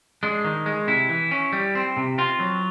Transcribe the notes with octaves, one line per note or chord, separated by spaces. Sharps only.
G#3 D4
D#3
G#3
C3 E4
E3
C#4
G3
C4
C3
C4 F4
F#3